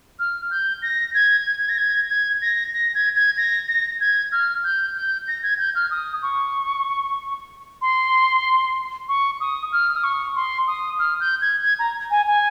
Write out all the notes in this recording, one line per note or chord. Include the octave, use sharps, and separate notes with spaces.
F6
G6
A#6
G#6
G#6
A#6
G#6
G#6
A#6
A#6
G#6
G#6
A#6
A#6
G#6
F6
G6
G6
A#6
G#6
G6
F6
D#6
C#6
C6
C#6
D#6
F6
D#6
C#6
C6
D#6
F6
G6
G#6
G#6
A#5
G#5
G#5